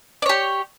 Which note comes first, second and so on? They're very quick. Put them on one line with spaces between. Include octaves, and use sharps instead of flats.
D5 C#5 G4